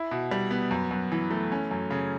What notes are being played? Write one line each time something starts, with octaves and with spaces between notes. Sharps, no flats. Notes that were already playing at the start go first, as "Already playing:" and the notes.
Already playing: E4
B2
G3
B3
F#2
F#2
E3
A3
C#4
F#2
C#3